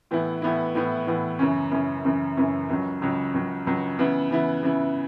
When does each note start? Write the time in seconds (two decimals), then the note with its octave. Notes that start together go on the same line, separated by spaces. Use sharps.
0.11 A2 E3 B3 E4
0.42 A2 E3 B3 E4
0.75 A2 E3 B3 E4
1.07 A2 E3 B3 E4
1.39 F#2 C#3 E3 C#4
1.72 F#2 C#3 E3 C#4
2.05 F#2 C#3 E3 C#4
2.37 F#2 C#3 E3 C#4
2.70 C#2 C#3 F#3
3.02 C#2 C#3 F#3
3.34 C#2 C#3 F#3
3.67 C#2 C#3 F#3
3.99 C#3 E3 B3 E4
4.31 C#3 E3 B3 E4
4.63 C#3 E3 B3 E4